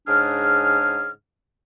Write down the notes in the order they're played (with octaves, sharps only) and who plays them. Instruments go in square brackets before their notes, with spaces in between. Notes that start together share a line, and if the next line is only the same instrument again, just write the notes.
[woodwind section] G#2 C#3 D4 G#4 F6